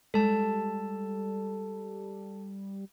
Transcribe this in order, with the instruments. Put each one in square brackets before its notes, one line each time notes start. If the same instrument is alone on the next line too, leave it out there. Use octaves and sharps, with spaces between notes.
[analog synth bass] G3 [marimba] G#3 [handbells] A4 A5